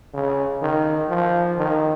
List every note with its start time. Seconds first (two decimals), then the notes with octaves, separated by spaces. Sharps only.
0.13 C#3
0.61 D#3
1.09 F3
1.58 D#3